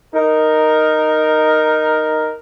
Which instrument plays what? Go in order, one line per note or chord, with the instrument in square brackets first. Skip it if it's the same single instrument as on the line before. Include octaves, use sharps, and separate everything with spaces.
[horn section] D#4 A#4